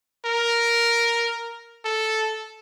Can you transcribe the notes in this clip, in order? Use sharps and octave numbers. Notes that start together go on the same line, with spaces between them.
A#4
A4